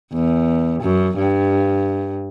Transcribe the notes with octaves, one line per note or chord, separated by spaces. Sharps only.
E2
F#2
G2